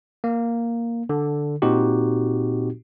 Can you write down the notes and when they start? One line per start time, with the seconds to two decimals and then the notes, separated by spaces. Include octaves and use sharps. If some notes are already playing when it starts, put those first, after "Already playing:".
0.24 A#3
1.09 D3
1.62 A#2 C4 D#4 F#4 G4